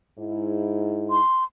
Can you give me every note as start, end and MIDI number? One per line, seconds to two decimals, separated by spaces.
0.18 1.19 44
0.18 1.19 64
1.10 1.44 84